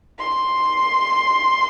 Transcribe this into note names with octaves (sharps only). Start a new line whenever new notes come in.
C6